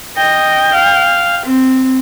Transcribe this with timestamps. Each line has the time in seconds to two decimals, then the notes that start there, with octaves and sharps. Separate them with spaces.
0.17 D#5 G5
0.74 F5
1.45 C4